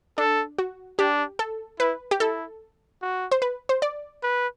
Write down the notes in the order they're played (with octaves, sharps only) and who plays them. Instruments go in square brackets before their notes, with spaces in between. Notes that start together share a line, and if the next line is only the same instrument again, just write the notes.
[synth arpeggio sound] D4 [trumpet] A4
[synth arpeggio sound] F#4
[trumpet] D4 [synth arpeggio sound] G4
[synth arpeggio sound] A4
[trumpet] E4 [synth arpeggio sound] B4
[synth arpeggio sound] G4
[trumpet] E4 [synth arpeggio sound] A4
[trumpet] F#4
[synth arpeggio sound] C5
B4
C5
D5
[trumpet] B4